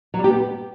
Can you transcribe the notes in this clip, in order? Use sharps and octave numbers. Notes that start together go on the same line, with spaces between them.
F#3
G3
G4
B3